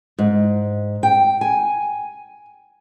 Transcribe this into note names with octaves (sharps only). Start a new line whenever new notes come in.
G#2
G5
G#5